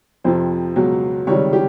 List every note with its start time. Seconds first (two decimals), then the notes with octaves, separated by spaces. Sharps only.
0.24 F2 C3 F3 C5
0.76 C#2 B2 F#3
1.27 C#2 C3 D#3 G3 C#5
1.53 G4